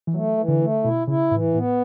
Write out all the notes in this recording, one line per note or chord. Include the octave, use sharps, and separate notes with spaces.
E3
F#3 A3
E3
D3
A3
B2 E4
C#3 E4
A2 E3
A2 B3